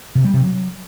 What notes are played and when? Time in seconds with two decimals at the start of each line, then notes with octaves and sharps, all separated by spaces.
0.15 C3
0.24 G3
0.34 C3
0.43 F#3